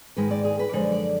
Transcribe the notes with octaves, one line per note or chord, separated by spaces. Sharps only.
G#2 D#3 G#3 B4
D5
G#4
B4
F#2 D3 F3 G#3 D5
D5